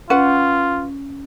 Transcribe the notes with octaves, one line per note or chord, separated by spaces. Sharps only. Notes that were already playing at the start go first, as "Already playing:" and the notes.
C#4 F4 B4 F#5